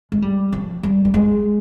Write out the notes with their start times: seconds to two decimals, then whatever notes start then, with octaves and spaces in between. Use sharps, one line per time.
0.12 G#3
0.22 G3
0.52 F3
0.83 G3
1.05 G3
1.14 G#3